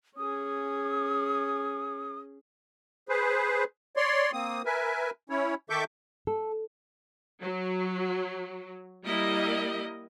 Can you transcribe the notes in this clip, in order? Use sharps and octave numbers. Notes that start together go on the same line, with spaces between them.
C#4 G#4 D#6
G#4 B4 C5
C#5 D5 C6
A#3 C4 D#6
A#4 B4 E5 G#5
C#4 E4 C#5
D#3 A4 E5 C#6 D6 G6
A4
F#3
G3 A#3 E4 A#4 D#5